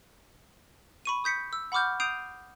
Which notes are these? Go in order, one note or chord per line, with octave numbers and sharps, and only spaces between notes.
B5 C#6 D#7
D#6 G6 B6 C#7
E6
F#5 B5 C#6 D6 F6 G6
D#6 G6 C7 D7 D#7 F7